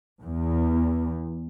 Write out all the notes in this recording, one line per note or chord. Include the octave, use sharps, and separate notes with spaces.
E2